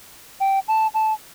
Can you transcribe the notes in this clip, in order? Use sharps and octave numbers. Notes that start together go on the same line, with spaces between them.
G5
A5
A5